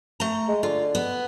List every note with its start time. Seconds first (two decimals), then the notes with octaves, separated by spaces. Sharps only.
0.20 A3 A#5
0.48 G#3
0.63 D3 F4
0.95 B3